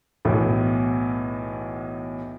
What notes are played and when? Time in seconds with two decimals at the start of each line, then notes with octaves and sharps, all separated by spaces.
0.25 B1 E2 A2